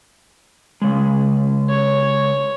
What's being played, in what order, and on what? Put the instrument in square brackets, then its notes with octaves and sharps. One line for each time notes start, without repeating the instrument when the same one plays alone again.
[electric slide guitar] C#3 G#3
[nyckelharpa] C#5